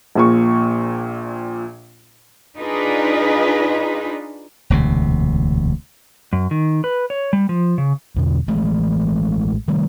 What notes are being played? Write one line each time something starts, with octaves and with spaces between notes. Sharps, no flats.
A#1 A#2 C#6
D4 D#4 F4 G#4 B4
E1 D2 C3
F#2
D#3
B4
C#5
G3
F3
C#3
E2 B2 D3
A1 E3 G#3 A3
D#3 G3 A3